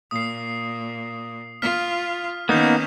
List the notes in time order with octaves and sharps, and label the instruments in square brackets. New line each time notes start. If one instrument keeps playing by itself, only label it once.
[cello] A#2 [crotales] D#6 C7
[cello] F4 [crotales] F6 B6
[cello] D#3 C#4 [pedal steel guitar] A#3 B3 D#4 [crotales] D#6 G6